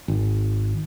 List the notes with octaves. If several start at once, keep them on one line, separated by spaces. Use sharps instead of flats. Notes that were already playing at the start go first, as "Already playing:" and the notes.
G#1